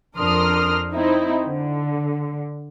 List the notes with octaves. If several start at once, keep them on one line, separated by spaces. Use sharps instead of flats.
F2 D4 A#4 C6 D#6 F6
C4 D#4 E4
D3